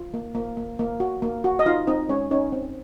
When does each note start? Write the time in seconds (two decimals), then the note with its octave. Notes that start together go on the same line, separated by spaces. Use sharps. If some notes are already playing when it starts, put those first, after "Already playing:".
Already playing: F4
0.14 A#3
0.35 A#3
0.57 A#3
0.79 A#3
1.00 F#4
1.22 A#3
1.44 F#4
1.59 D#5
1.66 D#4 F4 F5
1.87 C4 D#4 D#5
2.09 G#3 C#4 C#5
2.31 C#4 D#4 C#5
2.52 C4